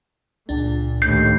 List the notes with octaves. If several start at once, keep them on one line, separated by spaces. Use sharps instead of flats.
C#2 A#2 D4
D#2 A2 G6 C7